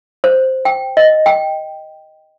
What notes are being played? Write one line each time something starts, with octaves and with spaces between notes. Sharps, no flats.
C5
G5
D#5
G5